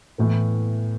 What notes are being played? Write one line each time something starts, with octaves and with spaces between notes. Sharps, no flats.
A2 E3 B3